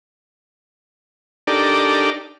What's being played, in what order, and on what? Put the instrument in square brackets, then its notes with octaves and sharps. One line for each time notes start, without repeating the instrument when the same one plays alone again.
[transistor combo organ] D4 D#4 G4 A4 A#4 D5